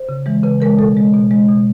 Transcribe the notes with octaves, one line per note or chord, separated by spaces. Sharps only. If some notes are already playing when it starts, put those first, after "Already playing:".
Already playing: C5
C#3
E3 G#3
C#3 B4
E3 G#3 A#4
B2 A4
G#3
B2
G#3
B2